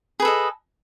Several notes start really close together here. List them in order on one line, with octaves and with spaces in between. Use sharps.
G#4 B4 A4 D#5